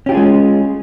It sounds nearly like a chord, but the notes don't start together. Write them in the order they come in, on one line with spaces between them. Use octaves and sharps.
C#4 G4 F4 G#4 G#3